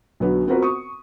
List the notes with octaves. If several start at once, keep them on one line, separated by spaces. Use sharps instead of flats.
B1 D3 F#3 B3
B3 C4 F4 F#4 A#4 B4
C#6 D#6